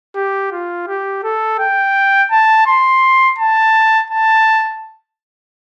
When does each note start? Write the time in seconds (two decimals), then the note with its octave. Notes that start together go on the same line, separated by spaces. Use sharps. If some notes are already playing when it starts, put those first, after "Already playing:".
0.16 G4
0.52 F4
0.87 G4
1.23 A4
1.59 G5
2.31 A5
2.67 C6
3.38 A5
4.10 A5